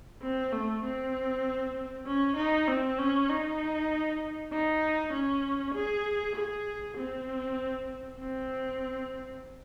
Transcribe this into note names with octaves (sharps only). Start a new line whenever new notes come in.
C4
A3
C4
C#4
D#4
C4
C#4
D#4
D#4
C#4
G#4
G#4
C4
C4